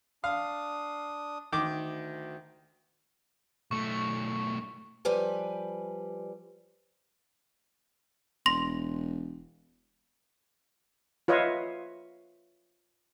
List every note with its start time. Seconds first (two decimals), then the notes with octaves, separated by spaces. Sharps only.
0.24 D4 F5 D#6
1.53 D2 D#3 D6
3.71 B1 A3 C#6
5.05 F3 G3 G4 B4 G#5
8.46 E1 C6 A#6 F7
11.28 F4 B4 C#5 D#5 E5